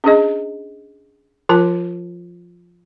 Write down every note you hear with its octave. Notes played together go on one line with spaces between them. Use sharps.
C#4 D4 G#4 D#5
F3 F4 A#4 A5